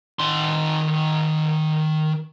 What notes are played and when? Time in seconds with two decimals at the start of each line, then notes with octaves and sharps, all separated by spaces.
0.19 D#3 C6